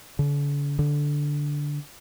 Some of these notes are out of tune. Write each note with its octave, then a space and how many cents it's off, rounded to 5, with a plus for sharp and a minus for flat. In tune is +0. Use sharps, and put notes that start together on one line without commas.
D3 -45
D3 -5